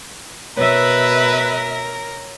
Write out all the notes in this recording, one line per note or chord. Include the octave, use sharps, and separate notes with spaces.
B2 A#4 B4 C#5 E5 E6